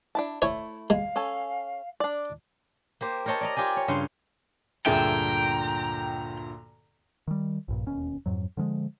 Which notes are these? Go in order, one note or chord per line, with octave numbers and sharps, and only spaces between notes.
D4 E4 A5
A3 E4 C#5
G#3 F5
C#4 A4 G#5
D4 D5
A#3 G4 C5
A#4 C5 C#5 D#5 A5
D5 D#5 A#5
F4 G4 D5 G#5
C#5
G2 C#3 F4 C6
D2 G2 A#2 G#4 A4 E5 G5 A#5
D#3 G3
A#1 G2 A#2
E1 D#2 B2 C#4
F2 G#2 F#3
D3 F3 G3 G#3